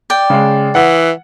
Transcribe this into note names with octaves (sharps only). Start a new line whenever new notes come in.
D5 G5
C#3 G#3
E3 F#5